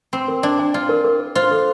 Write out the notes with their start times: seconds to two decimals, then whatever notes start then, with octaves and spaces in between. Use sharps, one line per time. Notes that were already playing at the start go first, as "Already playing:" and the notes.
0.13 C4 C6
0.28 A#4
0.43 D4 D5
0.59 G5
0.74 F4 D5
0.89 A#4
1.05 A#4
1.20 A#4
1.35 F4 C5
1.51 A4